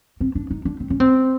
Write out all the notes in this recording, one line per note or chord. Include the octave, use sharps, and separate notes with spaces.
C4
D4
D#4
D4
C4
C#4
C4